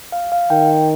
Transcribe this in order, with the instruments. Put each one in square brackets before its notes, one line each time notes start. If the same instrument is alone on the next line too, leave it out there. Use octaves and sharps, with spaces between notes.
[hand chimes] F5
F5
[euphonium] D#3 [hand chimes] G5